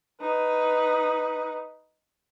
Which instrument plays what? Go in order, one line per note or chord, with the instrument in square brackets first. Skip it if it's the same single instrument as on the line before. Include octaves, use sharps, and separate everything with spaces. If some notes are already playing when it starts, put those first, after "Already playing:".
[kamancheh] D#4 B4